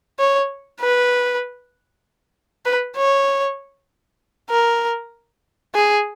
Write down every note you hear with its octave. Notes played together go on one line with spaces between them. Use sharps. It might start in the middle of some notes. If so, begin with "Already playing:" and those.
C#5
B4
B4
C#5
A#4
G#4